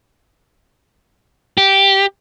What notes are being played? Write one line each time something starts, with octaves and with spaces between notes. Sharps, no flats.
G4